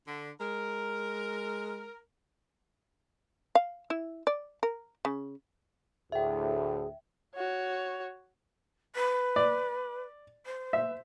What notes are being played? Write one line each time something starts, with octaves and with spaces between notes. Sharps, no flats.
D3
G#3 A#4
F5
E4
D5
A#4
C#3
D2 A2 G#4 E5 G5
F#4 C#5
B4
D5
C5
E5